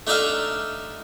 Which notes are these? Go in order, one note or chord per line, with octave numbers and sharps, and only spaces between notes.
A3 D4 D#4 A4 E5 F5